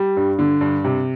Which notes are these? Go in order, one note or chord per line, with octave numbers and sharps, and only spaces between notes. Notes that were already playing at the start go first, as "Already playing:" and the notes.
Already playing: G3
G2
D3
G2
C3